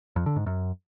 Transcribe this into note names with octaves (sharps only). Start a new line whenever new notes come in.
F2
D3
G#2
F#2